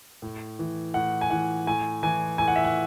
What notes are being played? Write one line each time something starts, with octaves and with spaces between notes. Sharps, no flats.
A2
E3
A2 F#5
G#5
E3 F#5
A2 G#5
E3 G#5
A2 G#5
F#5
E5
F#5